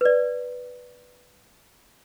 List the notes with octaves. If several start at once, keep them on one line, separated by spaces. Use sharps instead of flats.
B4 D5